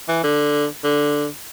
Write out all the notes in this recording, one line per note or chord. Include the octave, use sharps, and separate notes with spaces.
E3
D3
D3